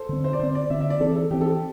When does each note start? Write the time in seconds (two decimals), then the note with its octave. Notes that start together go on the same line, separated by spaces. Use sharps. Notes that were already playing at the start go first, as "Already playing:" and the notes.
Already playing: A4 C5
0.09 D3 C4
0.24 C5
0.33 D5
0.39 D3 C4 C5
0.55 D5
0.70 D3 C4 E5
0.80 E5
0.90 D5
1.00 E3 C4 A4
1.16 A4
1.31 E3 C4 G4
1.41 A4
1.46 G4